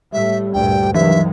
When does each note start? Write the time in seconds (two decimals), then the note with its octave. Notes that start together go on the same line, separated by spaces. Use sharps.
0.13 A2 G3 A3 E5
0.54 D2 G2 A#2 G5
0.94 G2 C3 D#3 E3 F#3 G#3 E5